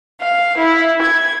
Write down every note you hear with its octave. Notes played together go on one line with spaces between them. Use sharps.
F5
E4
G#6